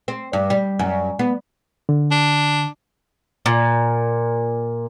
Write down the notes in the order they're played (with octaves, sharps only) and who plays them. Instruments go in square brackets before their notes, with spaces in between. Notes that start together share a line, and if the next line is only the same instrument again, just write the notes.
[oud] C4
G2
G3
F#2
B3
[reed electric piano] D3
[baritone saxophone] D4
[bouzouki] A#2